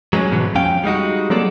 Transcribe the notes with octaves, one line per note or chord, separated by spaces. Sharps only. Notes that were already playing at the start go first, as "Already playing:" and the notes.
F#3 G#3 C4 C#4
G#2 B2 D3 E3 F#3
F2 C#4 F5 G5
G3 G#3 D#4 F#4
F#3 A#3 C4 G#4 A4 D5